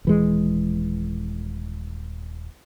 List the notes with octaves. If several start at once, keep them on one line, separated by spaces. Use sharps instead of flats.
D#1 E3 G#3